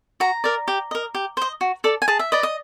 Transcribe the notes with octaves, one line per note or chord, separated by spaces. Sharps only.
F#4 A#5
A#4 D5
G4
A#4 D#5
G4
C5 D#5
F#4
A4 D5
G#5
G#4 A5
E5
B4 D5 D#5
D#5